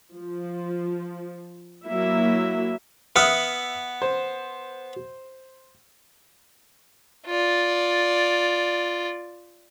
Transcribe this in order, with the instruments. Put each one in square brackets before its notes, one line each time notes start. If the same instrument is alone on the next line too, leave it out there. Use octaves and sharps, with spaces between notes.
[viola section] F3
F#3 A#3 E4 E5
[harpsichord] B3 F#5 [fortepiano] E5 D#6 F6
[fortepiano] C5
[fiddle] F4 D5